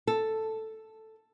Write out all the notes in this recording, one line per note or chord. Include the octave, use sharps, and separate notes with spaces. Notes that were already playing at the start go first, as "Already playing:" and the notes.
A4